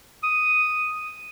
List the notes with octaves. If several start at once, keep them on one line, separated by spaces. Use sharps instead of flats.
D#6